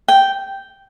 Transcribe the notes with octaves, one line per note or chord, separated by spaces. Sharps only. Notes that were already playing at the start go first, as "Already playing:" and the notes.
G5